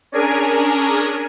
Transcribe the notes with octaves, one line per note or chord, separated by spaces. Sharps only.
C#4 D4 G#4 A#4 G#5